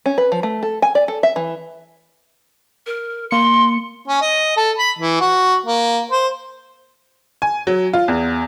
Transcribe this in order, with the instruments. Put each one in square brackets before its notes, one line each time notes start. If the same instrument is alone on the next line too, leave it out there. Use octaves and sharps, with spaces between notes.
[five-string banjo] C#4
B4
F3
A3
A4
G#5
D5
A4
E5
E3
[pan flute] A#4
[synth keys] A#3 C#7 [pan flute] C6
[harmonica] C#4
D#5
A4
B5
E3
F#4
A#3
C5
[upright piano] G#5
F#3
F4
E2